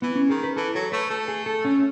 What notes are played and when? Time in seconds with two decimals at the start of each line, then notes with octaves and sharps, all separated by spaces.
0.02 E3 B3
0.16 C#4
0.30 D#3 G#4
0.44 B4
0.56 E3 A4
0.75 F#3 A4
0.92 A3 B4
1.10 A3 A4
1.28 G#4
1.46 A4
1.65 C#4